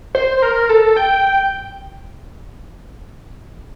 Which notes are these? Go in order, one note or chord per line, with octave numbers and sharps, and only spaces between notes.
C5
A#4
A4
G5